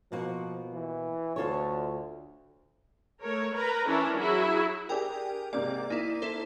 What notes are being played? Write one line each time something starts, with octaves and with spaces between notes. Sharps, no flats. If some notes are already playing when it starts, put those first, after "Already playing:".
B2 F3 A#3 F#4
E3
D2 F4 A4 C#5
A3 A#4 C#5
A#4 B4 A#5
E3 C#4 D4 E4 A#4
F#3 E4 F#4 G#4
D4 G4 G#4 A#4 G5 G#5
G#2 C3 A#3 D5
A#3 D#4 E4
E4 A4 C5